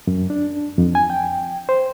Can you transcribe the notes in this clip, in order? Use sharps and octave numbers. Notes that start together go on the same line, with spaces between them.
F#2
D4
F2
G#5
G5
C5